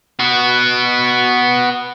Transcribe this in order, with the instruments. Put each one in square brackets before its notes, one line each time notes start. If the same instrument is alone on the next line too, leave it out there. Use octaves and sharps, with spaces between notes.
[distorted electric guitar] B3 F#4